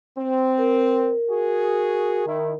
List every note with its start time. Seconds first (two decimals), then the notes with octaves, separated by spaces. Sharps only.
0.18 C4
0.58 A#4
1.30 F#4 G#4
2.27 D#3 E4